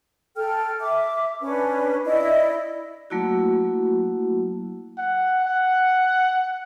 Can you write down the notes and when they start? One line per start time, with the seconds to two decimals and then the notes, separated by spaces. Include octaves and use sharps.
0.36 A4 G5 F6
0.80 E5 D6
1.42 C#4 D4 B4
2.05 E4 D5 D#5
3.10 F#3 A3 A#3 E4 F#4
4.98 F#5
5.45 F#5